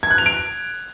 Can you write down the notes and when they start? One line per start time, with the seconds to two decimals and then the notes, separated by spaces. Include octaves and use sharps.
0.03 G#6
0.11 F#6
0.18 F7
0.26 D7